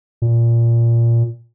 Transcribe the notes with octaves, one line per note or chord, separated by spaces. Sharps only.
A#2